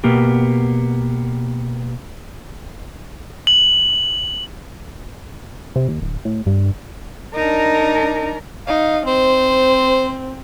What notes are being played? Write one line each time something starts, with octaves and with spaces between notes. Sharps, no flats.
B2 A#3 B3 G4
F#7
C3
D#2
D1
A2
G2
D4 D#4 A#4
D#4 F5
C4 C5